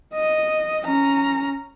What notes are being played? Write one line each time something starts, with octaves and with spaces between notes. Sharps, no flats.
D#5
C#4 A#5